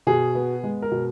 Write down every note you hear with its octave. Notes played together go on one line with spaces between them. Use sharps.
B2 G#4
B3
G#3
A#4
B2